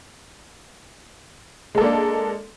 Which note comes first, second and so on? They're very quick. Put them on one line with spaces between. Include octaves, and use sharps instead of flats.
G#3 A4 A#3 D4